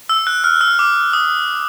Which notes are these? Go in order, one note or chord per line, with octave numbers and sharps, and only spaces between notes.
E6
F#6
F6
E6
D6
D#6